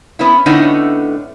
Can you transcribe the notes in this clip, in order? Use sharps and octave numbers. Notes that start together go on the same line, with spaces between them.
B3 C#4 E4
A2 D3 A3 B3 C#4 D#4